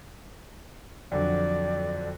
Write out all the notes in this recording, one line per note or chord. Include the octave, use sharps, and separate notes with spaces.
F2 D3 F#3 D5